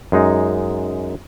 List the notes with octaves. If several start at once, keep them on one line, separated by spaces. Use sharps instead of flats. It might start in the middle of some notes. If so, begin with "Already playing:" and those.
F#2 G#3 D#4